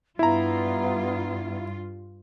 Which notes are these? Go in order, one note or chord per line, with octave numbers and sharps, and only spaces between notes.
G2 B3 E4 F4 A#5